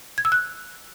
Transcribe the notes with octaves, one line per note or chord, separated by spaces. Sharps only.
G#6
E6
F#6